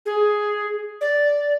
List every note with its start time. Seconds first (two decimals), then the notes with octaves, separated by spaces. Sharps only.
0.06 G#4
1.01 D5